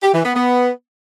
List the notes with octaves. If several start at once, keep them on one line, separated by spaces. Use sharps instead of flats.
G4
E3
B3
B3